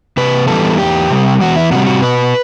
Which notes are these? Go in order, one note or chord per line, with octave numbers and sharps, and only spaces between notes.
C3 B4
E3 G3 B3 A4
E2 G4
C3 G3
E2 F#4
E4
C3 G3 F#4
F#4
B2 B4